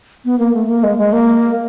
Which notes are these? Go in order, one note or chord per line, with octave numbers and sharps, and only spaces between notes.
B3
A#3
A3
A#3
G#3
G#3
A#3